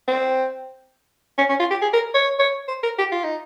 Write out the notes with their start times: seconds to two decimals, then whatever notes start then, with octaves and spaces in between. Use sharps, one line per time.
0.08 C4
1.38 C#4
1.49 C#4
1.60 F4
1.71 G4
1.82 G#4
1.93 A#4
2.14 C#5
2.39 C#5
2.68 C5
2.83 A#4
2.98 G4
3.12 F4
3.24 D#4